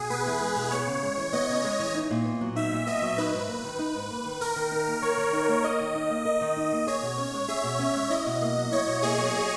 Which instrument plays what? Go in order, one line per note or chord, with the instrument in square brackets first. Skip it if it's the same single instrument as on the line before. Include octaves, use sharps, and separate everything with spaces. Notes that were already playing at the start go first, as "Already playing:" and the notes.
Already playing: [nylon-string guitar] B2 [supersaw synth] G#4
[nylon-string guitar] B3 [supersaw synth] B4
[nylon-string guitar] E2
G#3
B2
[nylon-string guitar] B3 [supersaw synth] C#5
[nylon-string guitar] C#3
G#3
E3
[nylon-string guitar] B3 [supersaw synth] D#5
[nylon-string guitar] C#3
G#3
E3
D#4
A#2
B3
F#3
[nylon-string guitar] D#4 [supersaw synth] E5
[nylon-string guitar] A#2
[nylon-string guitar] B3 [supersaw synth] D#5
[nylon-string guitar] F#3
[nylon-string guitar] D#4 [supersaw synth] B4
[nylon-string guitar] G#2
A#3
D#3
D#4
G#2
A#3
D#3
[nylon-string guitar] D#3 [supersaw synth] A#4
[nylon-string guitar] D#3
D#4
A#3
[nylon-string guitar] D#3 [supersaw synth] C#5
[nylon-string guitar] D#3
D#4
A#3
[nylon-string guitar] A#4 [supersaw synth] D#5
[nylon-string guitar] D#3
D#4
A#3
[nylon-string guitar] A#4 [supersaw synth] D#5
[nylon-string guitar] D#3
D#4
A#3
[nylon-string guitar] G#4 [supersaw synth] C#5
[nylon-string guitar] B2
C#4
G#3
[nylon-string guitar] G#4 [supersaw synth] E5
[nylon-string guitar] B2
C#4
G#3
[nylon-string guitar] E4 [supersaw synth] D#5
[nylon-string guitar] B2
A#3
F#3
[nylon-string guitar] E4 [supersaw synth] C#5
[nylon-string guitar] B2
[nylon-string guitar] A#3 [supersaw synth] G#4
[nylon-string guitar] F#3